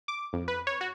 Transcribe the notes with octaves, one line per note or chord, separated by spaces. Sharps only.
D6
F2
B4
C#5
F#4